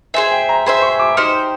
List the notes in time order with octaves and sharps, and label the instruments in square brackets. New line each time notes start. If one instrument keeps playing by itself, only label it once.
[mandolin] G#4 C5 E5 [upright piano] G#5
[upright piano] G5
A#5
[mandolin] G#4 C5 E5 [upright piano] B5
[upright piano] C#6
D6
[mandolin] D#4 G4 C5 [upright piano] F6